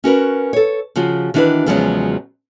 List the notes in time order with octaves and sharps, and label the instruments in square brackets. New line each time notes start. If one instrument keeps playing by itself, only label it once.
[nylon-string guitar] C#4 F#4 A#4 B4
A4 C#5
C#3 F3 F4 F#4
D#3 E3 D4 E4 F#4 B4
E2 C#3 F3 F#3 G#3 C#5